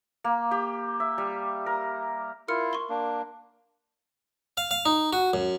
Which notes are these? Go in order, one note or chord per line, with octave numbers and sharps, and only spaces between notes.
A#3
G4
E5
G3
A#4
E4 F4 A#4 F6 C#7
C6 C#6
A#3 D4
F5
F5
D#4
F#4
F#2